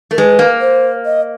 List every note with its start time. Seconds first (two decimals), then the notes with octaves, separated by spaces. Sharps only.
0.11 A3 A#4
0.18 G#3 B4
0.39 A#3
0.61 C5
1.05 D#5